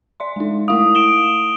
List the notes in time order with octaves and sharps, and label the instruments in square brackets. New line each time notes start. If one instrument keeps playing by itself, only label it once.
[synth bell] D5 E5 C6
G#3 D#4
[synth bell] A3 E4 F5 [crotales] D#6
[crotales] D7 E7 G7